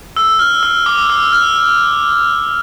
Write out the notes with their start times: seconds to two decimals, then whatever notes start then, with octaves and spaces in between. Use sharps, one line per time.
0.16 E6
0.39 F6
0.63 E6
0.86 D6
1.10 E6
1.32 F6